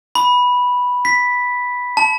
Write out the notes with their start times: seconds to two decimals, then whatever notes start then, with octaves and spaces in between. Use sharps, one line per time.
0.15 B5
1.05 B6
1.97 A5